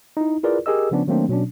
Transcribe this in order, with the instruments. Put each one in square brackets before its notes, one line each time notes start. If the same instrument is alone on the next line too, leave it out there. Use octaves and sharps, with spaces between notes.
[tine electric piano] D#4 E4
E4 F4 G#4 A#4 B4 D5
G4 G#4 A#4 D#5 E6
C#3 F3 B3 C#4 D4
D#3 F#3 A3 A#3 C4 D4
B2 F#3 C#4 D4